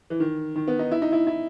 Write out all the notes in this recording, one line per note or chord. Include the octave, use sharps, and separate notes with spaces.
E3
D#3
D#3
B3
D#4
E4
D#4
E4
E4